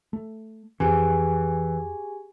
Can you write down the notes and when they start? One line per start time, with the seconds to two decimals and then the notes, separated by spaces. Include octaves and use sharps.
0.13 A3
0.80 F2 E3 C4 G4 G#4 G#5